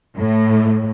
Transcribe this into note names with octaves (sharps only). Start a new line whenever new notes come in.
A2